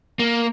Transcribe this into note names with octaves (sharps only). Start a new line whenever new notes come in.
A#3